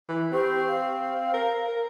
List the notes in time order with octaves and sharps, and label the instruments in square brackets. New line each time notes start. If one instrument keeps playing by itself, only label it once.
[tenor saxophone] E3
[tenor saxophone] C4 [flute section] G4 C5 C#6
[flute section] F5
[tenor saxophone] A#4
A#4